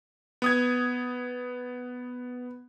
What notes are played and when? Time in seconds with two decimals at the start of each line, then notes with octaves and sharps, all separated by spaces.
0.42 B3 D#6 G#6